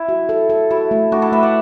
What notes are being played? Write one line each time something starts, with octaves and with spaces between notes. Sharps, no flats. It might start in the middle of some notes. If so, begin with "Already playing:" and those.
Already playing: E4
F#4
A4
A4
E4 F#4
A3
A3 D4 F#4
E4 A4
A3 B4 E5
D5 F#5